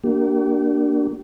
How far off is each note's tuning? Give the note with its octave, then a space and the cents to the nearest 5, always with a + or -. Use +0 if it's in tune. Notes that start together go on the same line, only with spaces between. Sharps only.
A#3 +0 D4 +0 G4 -40